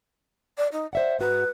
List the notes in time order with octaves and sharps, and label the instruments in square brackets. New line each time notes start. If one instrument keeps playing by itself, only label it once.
[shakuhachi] D5
D#4
[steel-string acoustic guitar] C5 E5 F#5 [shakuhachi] D5
[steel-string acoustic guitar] G#2 F#4 A#5 [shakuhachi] B4